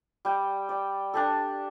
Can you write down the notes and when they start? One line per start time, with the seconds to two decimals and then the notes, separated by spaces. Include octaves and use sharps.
0.25 G3 G5
0.69 D5 G5
1.14 D4 G4 A4